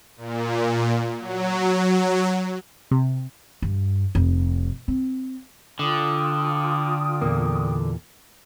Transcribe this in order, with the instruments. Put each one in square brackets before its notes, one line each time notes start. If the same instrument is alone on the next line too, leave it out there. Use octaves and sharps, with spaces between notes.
[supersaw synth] A#2
F#3
[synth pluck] C3
[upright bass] G2
F1
C4
[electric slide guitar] D3 [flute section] F4 G5 D#6
[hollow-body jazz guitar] E2 A#2 A#3